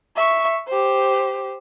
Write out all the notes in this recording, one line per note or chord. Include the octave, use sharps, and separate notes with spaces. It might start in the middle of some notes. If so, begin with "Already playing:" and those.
E5 C#6
G4 C5